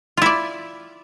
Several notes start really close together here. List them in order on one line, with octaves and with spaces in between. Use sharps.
F4 E4 D5